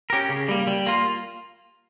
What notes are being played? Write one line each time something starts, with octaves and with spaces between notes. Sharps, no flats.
C#4 G4 A#4
C#3
G3 A#3
G3
A#3 F4